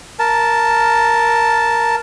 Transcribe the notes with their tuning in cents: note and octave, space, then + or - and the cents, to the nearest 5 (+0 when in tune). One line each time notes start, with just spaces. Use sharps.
A#4 +0 A5 +0